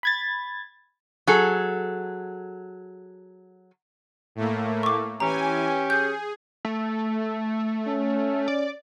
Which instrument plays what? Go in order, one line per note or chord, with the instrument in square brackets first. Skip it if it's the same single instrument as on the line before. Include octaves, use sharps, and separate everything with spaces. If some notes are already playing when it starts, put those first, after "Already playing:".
[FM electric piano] B5 G#6 A6
[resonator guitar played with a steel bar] F#3 G#4 A4
[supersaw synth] A2 A3 A#3
[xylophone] C#6 D6
[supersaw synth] E3 G#5 [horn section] C#4 G4 [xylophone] A#5
[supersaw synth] G#4 [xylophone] G6
[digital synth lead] A3
[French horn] C#4
[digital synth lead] D5